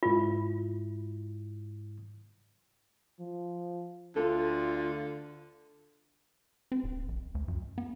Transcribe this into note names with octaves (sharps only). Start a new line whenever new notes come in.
G#2 E4 F4
F3
D2 D3 F4 A4
C4
D1
A#1
D2
F#2
B3